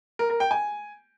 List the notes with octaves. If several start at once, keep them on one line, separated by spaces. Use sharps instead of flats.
A#4
A#4
G5
G#5